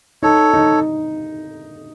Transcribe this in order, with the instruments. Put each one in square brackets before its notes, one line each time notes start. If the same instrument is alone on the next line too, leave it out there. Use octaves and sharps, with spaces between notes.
[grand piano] D#4 [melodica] A4 C#5
[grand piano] D#4